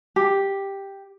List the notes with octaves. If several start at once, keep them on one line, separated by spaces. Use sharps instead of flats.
G4